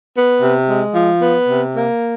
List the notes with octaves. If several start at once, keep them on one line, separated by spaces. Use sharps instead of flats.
B3
C3
G#3
F3
B3
C3
A#3